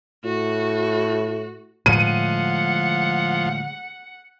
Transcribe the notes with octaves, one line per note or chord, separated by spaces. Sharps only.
A2 F#4
A2 D3 F3 G#3 F#5 D#7